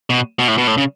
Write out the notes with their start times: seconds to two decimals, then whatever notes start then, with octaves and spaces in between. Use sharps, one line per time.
0.10 B2
0.39 B2
0.48 A2
0.58 B2
0.67 A2
0.78 C#3